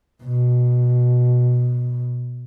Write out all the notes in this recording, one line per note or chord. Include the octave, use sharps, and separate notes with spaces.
B2